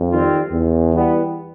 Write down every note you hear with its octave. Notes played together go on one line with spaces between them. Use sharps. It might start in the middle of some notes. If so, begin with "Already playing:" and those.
Already playing: F2
D#3 G3 C4 F4
E2
E3 G3 B3